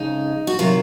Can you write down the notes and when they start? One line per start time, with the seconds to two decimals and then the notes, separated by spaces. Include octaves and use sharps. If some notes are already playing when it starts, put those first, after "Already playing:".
Already playing: F2 C#3 G#3 D#4
0.47 F#4
0.59 C3 D#3 F#3 F4